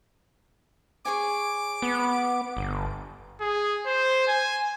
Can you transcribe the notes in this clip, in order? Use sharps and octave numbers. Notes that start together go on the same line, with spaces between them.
G#4 C#5 G#5 D6
B3
G1
G#4
C5
G#5